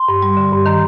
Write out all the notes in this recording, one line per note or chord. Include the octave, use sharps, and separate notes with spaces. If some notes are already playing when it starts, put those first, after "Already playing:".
Already playing: C6
G2
G3
D3
G2
D#3 A#5